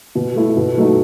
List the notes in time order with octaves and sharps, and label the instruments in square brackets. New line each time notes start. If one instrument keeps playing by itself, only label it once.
[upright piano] B2
A3 E4
B2
F#3 A3 D#4